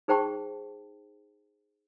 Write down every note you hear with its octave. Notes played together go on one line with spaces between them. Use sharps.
D#4 G#4 C5 G5 A5 C#6